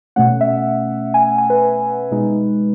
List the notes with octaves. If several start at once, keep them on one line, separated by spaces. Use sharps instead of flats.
B2 A3 C#4 F#5
E5
G#5
G#5
B4
B2 G#3 D#4